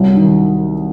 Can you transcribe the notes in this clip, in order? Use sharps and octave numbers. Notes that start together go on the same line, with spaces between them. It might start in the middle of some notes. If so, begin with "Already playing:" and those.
Already playing: C2 F#3
D#3